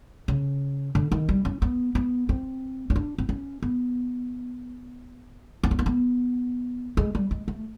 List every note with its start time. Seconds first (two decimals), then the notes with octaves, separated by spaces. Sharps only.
0.28 C#3
0.95 D3
1.12 D#3
1.29 G3
1.45 C#4
1.62 B3
1.95 B3
2.29 C4
2.90 C#4
2.96 D4
3.18 C4
3.29 C#4
3.62 B3
5.63 C4
5.71 B3
5.79 A#3
5.86 B3
6.97 G#3
7.15 G3
7.31 G#3
7.48 A3